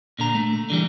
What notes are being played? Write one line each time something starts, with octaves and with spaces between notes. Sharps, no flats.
A#2 D3 A#5
A3
D3 E3 G3